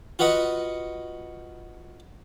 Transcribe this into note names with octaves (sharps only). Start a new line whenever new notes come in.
F4 F#4 B4 D#5 F#5